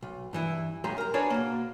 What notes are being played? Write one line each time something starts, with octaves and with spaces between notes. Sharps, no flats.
B1
G2 E3 E4
B1 F#2 G#3 G4 C5 A#5
A#4 A#5
D4 F#4 G#4 B4 C#5 D5
B2 A#3